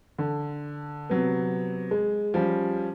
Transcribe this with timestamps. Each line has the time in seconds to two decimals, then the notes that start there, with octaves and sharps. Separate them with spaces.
0.18 D3
1.09 C3 F#3 B3
1.91 G#3
2.34 F3 G3 C#4